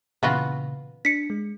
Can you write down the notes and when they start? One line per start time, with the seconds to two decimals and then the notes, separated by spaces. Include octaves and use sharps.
0.23 A#2 C#3 E3 B3 F4 F#4
1.05 D4 B6 C#7
1.30 G#3